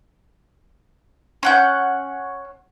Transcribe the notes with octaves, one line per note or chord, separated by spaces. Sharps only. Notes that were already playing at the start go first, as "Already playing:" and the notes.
C#4 F#5 G6